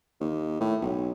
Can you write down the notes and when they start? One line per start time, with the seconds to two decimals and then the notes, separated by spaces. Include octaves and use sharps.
0.20 D#2
0.61 A2
0.81 B1